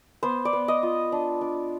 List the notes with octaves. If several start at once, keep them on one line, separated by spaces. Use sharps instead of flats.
B3 C5
D5
B3
D#5
F4
D4
D4